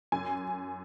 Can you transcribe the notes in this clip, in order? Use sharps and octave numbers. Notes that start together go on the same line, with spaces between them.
F#2 G#5